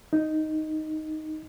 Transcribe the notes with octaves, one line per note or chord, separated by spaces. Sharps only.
D#4